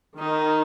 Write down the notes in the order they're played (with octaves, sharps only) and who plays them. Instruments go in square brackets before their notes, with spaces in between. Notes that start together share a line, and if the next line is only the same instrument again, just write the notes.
[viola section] D#3 [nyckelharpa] D#4